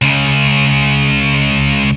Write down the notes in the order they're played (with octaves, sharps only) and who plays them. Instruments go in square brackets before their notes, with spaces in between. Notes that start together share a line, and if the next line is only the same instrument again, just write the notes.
[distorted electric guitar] C#2 C#3